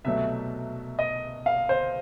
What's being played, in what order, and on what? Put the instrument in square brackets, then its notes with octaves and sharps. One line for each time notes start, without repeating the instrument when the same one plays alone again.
[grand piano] C2 B2 F#3 A3 E5
D#5
F5
C5